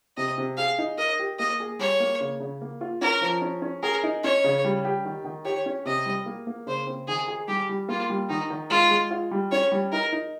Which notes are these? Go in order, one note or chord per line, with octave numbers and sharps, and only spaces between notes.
C3 D#5
C3
G#4 F5
D#4
A#4 D#5
G4
A#3 D#5
G#4
G3 C#5
A#3
C#3
C#3
A#3
F4
C#4 A#4
F3
C#4
C#4
G#4 A#4
D#4
C#4 C#5
C#3
G3
G4
D#3
D#3
G4 C#5
C#4
C3 D#5
G3
A#3
A#3
C#3 C5
C4
D#3 G#4
G#4
G3 G4
G3
A#3 F4
G3
D#3 D#4
D#3
G#3 F4
G#3
F4
G3
C#4 C#5
G3
D#4 A#4
D#4